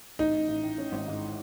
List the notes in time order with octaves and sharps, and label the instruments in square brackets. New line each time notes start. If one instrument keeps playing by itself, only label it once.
[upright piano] A1 [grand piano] D#4
[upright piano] A1
A1
A2
C#4
G#1
G#2